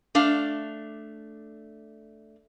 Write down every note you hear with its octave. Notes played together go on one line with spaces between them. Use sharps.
A3 D4 F5